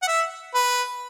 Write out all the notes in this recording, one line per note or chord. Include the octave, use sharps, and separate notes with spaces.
F#5
E5
B4